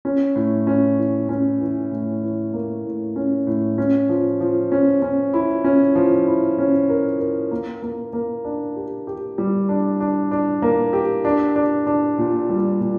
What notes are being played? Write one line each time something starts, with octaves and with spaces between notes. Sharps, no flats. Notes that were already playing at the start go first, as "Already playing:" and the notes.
C#4
A2
C#4
E3
C#4
E3
A2
E3
A#3
A2
C#4
A2
C#4
F3
F3
C#4
C#4
E4
C#4
F3
E4
C#4
A#4
A#4
A#3
A#3
A#3
D4
G4
G4
G3
D4
D4
D4
A#3
G4
D4
D4
D4
A#2
G3
A#2